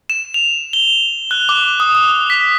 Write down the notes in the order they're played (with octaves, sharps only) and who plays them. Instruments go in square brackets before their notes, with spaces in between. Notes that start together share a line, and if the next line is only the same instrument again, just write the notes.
[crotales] E7
F7
G7
F#6
D6
D#6
D#6
B6